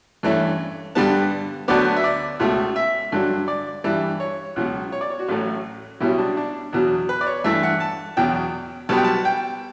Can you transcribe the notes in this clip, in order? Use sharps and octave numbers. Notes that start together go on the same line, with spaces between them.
G2 E3 A3 C#4
G2 D3 G3 B3 A5
D2 D3 F#3 B3 D5
E5
D5
C#2 B2 A3
E5
G2 D3 F#3
D5
G2 E3 G3
C#5
C#2 B2 F#3
C#5
D5
C#5
F#4
A1 A2 F#3 A3
B1 B2 G3 C#4 E4
D4
D4
E2 B2 F#3
B4
D5
C#5
G2 E3 A3 E5
F#5
A5
E2 B2 F#3 G5
B1 B2 G3 B3 A5
G5
A5
G5